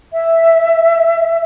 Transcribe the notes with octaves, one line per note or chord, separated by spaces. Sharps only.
E5